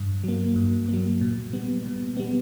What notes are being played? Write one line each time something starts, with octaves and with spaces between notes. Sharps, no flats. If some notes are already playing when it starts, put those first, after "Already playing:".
Already playing: G2
F#3 A#3
G2
F#3 A#3
A#2
G3 B3
A#2
G3 B3